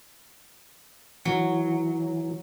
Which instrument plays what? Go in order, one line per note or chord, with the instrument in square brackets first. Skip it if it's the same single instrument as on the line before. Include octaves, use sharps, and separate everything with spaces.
[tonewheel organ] E3 [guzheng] F#3